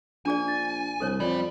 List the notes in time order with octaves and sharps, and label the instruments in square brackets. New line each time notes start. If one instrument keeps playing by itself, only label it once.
[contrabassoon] A#1 [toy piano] D4 G#4 D5 [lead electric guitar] G#5
[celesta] A6
[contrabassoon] C2 [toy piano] A4 C5 C#5
[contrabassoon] F2 [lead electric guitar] G3 [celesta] D5